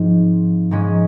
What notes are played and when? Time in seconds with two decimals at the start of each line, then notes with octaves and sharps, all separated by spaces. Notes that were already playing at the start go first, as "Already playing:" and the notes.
Already playing: G#2 F3 C4
0.71 G#2 F3 G#3 C#4